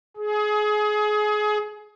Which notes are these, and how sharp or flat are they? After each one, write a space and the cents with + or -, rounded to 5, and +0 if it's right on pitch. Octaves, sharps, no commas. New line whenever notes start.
G#4 +25